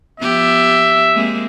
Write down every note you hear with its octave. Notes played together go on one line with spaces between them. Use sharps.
F3 B3 G4 E5
G#3 A#3 C4